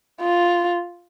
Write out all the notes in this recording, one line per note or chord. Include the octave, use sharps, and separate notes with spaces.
F4